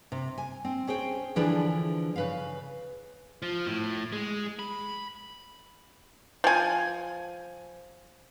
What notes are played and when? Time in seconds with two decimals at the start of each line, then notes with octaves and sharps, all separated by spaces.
0.12 C3
0.38 G#5
0.65 C4
0.87 C#4 G#4 C5 G5
1.36 D3 E3 F3 D4 E4 G#4
2.16 C#3 B4 F5
3.42 F3
3.66 A2
4.12 G#3
4.59 B5
6.44 F3 G#5